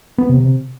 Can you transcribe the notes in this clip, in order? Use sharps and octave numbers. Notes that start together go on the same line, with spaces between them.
B3
C3
C3